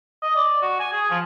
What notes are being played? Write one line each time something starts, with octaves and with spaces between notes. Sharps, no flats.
D#5
D5
F#4
G#5
G#4
F3